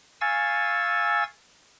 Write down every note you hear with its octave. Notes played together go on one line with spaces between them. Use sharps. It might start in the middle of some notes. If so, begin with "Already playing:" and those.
F5 G#5 C#6 E6 A6